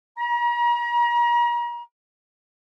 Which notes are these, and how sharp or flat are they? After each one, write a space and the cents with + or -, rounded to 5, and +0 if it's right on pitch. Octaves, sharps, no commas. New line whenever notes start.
A#5 +40